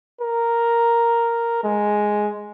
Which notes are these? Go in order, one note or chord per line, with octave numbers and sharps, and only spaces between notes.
A#4
G#3